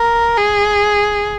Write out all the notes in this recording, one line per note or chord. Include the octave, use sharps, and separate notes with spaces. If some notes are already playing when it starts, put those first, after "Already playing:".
Already playing: A#4
G#4